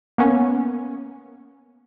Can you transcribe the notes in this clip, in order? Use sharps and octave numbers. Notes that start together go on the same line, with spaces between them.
A#3 B3 C#4